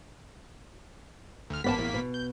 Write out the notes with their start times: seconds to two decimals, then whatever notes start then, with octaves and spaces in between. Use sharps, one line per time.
1.50 D2 F6
1.64 A1 A#3 B3 D5 A5 B6
1.79 E2
1.94 B2
2.14 G6